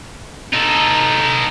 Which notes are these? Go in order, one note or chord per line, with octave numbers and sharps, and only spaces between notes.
D#4 A4